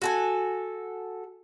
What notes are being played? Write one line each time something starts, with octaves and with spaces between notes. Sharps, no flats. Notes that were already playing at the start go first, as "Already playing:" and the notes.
F#4 A4 G#5